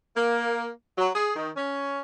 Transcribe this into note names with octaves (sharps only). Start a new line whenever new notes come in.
A#3
F#3
G#4
D#3
C#4